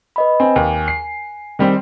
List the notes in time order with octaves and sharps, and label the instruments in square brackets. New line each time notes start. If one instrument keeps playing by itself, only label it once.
[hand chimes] B4 D#5 B5
[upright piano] C4 [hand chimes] G#5
[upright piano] D#2
C7
D#3 G3 C4